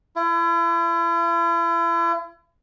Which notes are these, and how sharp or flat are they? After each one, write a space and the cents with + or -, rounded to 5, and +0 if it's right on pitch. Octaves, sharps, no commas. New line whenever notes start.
E4 +40